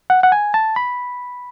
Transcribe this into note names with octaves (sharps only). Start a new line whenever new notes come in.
F#5
F#5
G#5
A5
B5